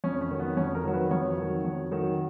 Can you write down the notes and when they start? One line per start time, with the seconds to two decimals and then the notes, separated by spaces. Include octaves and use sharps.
0.04 F2 C#4
0.21 C#4
0.31 D#3 F#3
0.40 B3
0.57 F2 C#4
0.75 A#4
0.84 D#3 F#3
0.94 B4
1.11 F2 C#5
1.38 D#3 F#3
1.65 F2
1.91 D#3 F#3